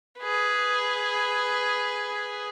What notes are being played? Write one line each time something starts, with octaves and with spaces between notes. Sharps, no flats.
G#4 B4